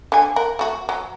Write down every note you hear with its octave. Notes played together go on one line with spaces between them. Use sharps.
D3 G#5
A#4 F#5
A3 F#4
F#3